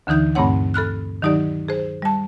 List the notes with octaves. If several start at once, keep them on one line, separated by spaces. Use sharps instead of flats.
D2 D3 E3 D#4 G6
G2 A#2 A3 C4 C#5 F#5
A4 B5 F6 F#6
D#3 F#3 D#4 G4 D5
G#4 C5
G3 A5